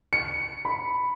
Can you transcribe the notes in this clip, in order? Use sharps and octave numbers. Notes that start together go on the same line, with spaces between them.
C#7
B5